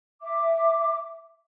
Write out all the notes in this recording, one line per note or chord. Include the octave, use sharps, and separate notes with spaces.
E5 D6